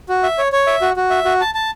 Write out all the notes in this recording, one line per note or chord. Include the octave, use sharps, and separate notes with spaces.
F#4
E5
C#5
C#5
E5
F#4
F#4
E5
F#4
A5
A5